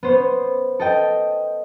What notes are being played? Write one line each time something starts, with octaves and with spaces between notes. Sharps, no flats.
B3 C5 C#5
A4 D#5 G5